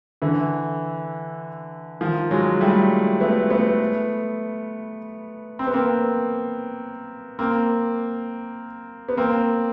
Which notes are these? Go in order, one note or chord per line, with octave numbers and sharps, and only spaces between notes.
D3 E3
D#3 F3
F#3 G#3
G3 A3
A3 B3
A3 B3
C4
B3
A#3 C4
A#3 C4
B3
A#3 C4